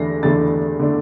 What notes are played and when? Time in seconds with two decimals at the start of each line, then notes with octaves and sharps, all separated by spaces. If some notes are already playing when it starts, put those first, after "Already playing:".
Already playing: E2 D3 A3 D4 A#6 C7
0.23 E2 D3 A3 D4 A6
0.80 D3 A3 D4